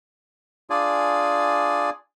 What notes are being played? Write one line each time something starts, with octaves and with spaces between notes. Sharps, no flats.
D4 F4 G#4 D5 G#5